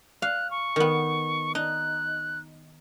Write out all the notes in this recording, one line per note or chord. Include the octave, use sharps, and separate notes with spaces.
F5 F#6
C#6
D#3 B3
D#4 F#6